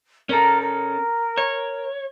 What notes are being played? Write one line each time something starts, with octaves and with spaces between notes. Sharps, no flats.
C#4 A4 A#4
A#4
C#5